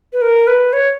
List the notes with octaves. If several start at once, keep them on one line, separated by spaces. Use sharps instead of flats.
B4
A#4
B4
C#5